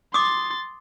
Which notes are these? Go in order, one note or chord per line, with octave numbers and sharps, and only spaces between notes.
C6 D6 D#6 A6